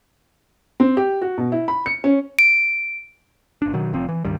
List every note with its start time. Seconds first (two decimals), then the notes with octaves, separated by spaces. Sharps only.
0.80 C4
0.97 G4
1.22 F#4
1.38 B2
1.52 E4
1.68 B5
1.86 C#7
2.04 C#4
2.39 D7
3.62 F#1 D4
3.73 B2 D#3 F#3
3.93 F1 C3 F3 C4
4.09 E3
4.25 C#2 G2 D#3 G3